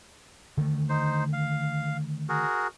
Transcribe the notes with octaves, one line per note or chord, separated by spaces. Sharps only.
D3 D#3 A3
D#4 C5
F5
F#4 G#4 A#4